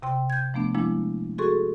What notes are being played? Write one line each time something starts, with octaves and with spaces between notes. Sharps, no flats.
C3 G5 C6
G6 G#6
F3 A3 B3 D4
F3 G#3 A#3 D4 E4
F#4 G#4 A4 C6 C#6